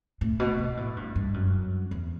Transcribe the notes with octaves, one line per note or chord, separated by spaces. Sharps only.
A2
B2
B2
A2
G2
G2
F#2
E2